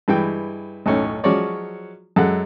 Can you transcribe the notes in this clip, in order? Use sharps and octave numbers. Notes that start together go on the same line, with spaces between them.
G2 E3 G#3 G5
B1 F#2 A2 C#4 D#4 A4
F3 F#3 G#3 C#4 C#5 D5
F#2 G#3 A4 F#5